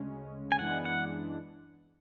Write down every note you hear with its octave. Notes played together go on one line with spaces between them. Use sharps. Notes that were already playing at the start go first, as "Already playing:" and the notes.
Already playing: D2 C#3 G#3 C#4
G#5
F#2 E3 G#3 B3 D4 F#5
F#5